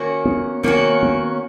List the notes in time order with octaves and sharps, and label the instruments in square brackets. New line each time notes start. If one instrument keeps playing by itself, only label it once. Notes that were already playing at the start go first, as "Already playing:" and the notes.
Already playing: [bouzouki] D#3 A#3 C#4 F#4
[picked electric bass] B3
[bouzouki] D#3 A#3 C#4 F#4 [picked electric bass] B3
[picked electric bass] B3